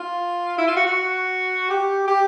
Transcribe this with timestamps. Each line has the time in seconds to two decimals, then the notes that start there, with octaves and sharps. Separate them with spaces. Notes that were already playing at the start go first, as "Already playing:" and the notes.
Already playing: F4
0.58 E4
0.67 F4
0.76 F#4
0.86 F#4
1.70 G4
2.08 G4